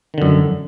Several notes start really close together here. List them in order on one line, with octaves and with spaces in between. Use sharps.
D#3 D3 F#2